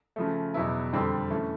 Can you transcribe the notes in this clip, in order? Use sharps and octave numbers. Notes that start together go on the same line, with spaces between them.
C#3 F3 A3
E2 B2 F#3 B3 E4
F2 D3 G3 C4
E3 A3 C#4